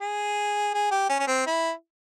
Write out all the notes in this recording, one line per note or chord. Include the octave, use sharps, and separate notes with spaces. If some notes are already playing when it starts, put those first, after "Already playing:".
G#4
G#4
G4
C#4
C#4
C4
E4